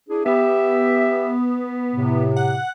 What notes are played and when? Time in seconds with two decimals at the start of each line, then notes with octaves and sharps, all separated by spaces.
0.09 D4 E4 G#4
0.26 B3 G4 E5
1.92 A2 C3
2.36 F#5